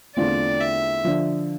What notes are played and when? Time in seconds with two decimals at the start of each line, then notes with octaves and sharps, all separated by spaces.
0.16 E2 D3 A3 C4 F4 D5
0.61 E5
1.05 D3 F3